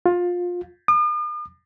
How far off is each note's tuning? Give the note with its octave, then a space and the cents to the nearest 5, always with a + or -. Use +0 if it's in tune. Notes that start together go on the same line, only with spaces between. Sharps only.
F4 +20
D#6 -45